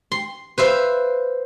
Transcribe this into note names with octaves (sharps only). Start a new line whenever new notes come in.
C6
B4 C5 E5 F5